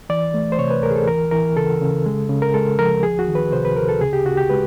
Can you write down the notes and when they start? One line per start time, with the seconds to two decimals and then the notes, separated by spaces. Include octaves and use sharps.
0.09 E3 D5
0.34 A3
0.52 C5
0.59 C3 C#5
0.70 B4
0.83 D2 A#4
0.91 G#4
0.96 A4
1.07 E3 A#4
1.31 E3 A#4
1.56 C#3 A4
1.81 C#3
2.06 G#3
2.29 C#3
2.42 A#4
2.54 G#3 A4
2.79 F3 A#4
3.03 D2 G#4
3.19 F#4
3.28 D#3
3.35 B4
3.52 C3 C5
3.65 B4
3.76 D2 A#4
3.89 A4
4.01 C#3 G#4
4.13 G4
4.25 C#3 F#4
4.37 G4
4.49 G#3 B4